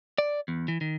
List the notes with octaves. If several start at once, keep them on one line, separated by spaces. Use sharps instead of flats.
D5
E2
E3
D#3